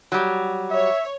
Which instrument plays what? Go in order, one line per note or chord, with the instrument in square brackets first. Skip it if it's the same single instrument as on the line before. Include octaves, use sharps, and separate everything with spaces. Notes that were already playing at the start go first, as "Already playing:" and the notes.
[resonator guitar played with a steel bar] F#3 G3
[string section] C#5 [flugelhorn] E5